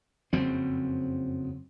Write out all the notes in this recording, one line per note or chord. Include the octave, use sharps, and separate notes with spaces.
F#1 F2 F#3 C4